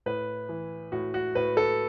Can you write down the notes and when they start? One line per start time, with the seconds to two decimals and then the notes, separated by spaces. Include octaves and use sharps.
0.06 A2 B4
0.49 E3
0.92 A2 F#4
1.14 F#4
1.35 A2 B4
1.57 A4